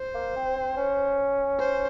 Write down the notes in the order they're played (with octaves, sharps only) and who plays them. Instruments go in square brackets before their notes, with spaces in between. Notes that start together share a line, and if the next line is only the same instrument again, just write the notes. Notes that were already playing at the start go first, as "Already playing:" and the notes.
Already playing: [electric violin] C5
[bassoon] A#3
C4
C4
C#4
[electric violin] C5